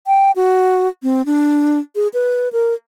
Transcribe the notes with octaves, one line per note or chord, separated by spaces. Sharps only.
G5
F#4
C4
D4
G#4
B4
A#4